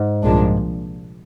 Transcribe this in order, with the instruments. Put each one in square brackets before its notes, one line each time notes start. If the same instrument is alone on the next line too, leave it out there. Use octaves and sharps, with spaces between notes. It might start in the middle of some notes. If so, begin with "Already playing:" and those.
Already playing: [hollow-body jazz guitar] G#2
[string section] C2 A#2 F3 G#3 D4